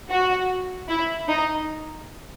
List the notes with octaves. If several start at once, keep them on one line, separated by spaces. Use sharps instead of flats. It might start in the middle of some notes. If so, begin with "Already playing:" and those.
F#4
E4
D#4